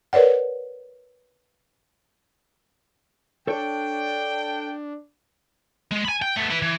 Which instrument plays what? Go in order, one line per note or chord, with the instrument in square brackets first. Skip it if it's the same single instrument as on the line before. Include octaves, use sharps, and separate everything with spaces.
[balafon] A#4 B4 C#5 D5 F#5
[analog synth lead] D4 [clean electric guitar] A4 C#5 [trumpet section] G5
[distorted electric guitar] G#3
G#5 B5
G5
A3 B3
E4 B4
E3